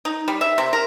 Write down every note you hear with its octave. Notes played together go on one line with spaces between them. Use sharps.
D#4
G3
E5
C3
A#4